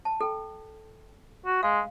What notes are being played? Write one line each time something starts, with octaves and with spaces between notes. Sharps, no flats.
A5
A4 G5
F#4
G#3 F5